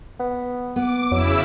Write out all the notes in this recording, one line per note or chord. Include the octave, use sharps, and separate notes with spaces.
B3
B3 D6
F2 C#3 F#3 E4 E6